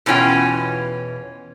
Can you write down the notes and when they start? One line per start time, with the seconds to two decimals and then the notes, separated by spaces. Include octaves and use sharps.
0.06 E2 B2 E3 C#4 F4 G5